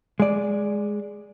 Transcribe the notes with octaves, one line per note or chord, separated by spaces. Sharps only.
G#3 D5